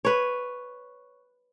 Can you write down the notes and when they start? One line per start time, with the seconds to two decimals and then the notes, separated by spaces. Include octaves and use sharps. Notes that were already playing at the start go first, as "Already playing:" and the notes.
0.05 B4 C#5